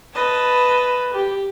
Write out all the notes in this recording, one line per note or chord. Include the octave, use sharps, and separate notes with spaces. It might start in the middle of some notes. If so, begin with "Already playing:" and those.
B4 D#5 A5
G4